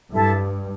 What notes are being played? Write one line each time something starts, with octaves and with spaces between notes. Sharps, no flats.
G2 E4 A4 E5 A5